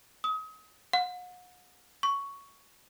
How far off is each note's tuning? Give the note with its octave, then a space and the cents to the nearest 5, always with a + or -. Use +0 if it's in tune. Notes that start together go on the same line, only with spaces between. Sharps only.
D#6 +35
F#5 -40
C#6 +5